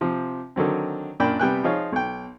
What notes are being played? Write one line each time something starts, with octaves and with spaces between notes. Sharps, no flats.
C3 F3
D3 D#3 F#3 C4
F#2 A#2 D4 G5 B5
C3 G3 B3 G5 G#5 F#6
F3 D#4 F4 G#4 C#5
B1 G5